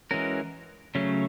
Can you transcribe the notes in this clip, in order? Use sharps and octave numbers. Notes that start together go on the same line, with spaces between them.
E3 G#3 C#4 F#4 A#4
C#3 F#3 A3 C#4